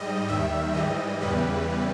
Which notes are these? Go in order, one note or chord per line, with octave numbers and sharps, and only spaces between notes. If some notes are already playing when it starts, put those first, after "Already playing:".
Already playing: G#2 G3 D#5
D#2 D#3 G3 E5
G#2 E3 G3 D#5
E2 C#3 E3 G3 B4